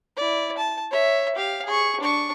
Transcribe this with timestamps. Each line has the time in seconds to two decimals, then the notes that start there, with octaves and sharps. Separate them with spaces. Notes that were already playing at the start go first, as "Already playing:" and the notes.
0.16 E4 D5
0.58 A5
0.91 C#5 E5
1.35 G4 F5
1.66 G#4 C#6
2.00 D4 C#6